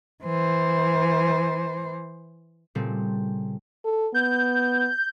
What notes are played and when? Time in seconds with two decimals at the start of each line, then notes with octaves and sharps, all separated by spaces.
0.24 E3 C5
2.75 A#2 C#3 G3 A3 C4
3.85 A4
4.14 B3 G6